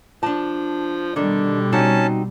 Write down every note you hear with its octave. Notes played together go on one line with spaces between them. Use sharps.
F3 D4 A5
B2 D3 D#3 G3 D4
C4 C#4 D#4 F#4 A5